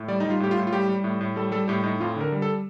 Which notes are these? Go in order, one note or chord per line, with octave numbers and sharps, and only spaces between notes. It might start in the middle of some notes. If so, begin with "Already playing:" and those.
Already playing: A2
G3 D5
G3 D#4
F4
A2 G4
F4
A2
F4
G3 G4
G3
A2
A2
G3 A4
G3 A4
A2 G4
A2 D#4
F2 F4
D3 A#4
G3
A4